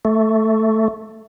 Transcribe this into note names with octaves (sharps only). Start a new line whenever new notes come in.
A3